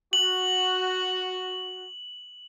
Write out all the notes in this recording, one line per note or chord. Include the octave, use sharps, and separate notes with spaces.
F#4 F#7